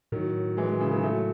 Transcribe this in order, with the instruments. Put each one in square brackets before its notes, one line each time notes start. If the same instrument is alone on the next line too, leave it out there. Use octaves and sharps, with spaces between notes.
[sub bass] A2 [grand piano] D#3 F#3
[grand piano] E3 G#3
E3 G#3
C#3 E3
D#3 F#3
F#3 A3